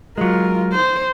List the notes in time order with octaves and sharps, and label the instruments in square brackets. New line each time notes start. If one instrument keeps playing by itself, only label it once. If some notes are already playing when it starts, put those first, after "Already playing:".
[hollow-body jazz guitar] F#3 G#3 [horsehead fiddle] F4 A#4
[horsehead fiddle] C5